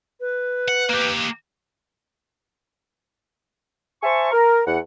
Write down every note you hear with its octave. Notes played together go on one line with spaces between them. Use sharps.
B4
F#5
A#3 G4
C5 E5 G#5 A5 C#6
A#4
E2 F#5